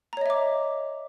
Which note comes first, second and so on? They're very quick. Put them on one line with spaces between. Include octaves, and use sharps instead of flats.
A#5 C#5 D#5 E5 D6